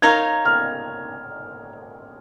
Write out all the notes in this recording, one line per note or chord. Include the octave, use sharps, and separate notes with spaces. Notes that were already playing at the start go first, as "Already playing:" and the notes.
D#4 A#4 C#5 F5 G#6
F6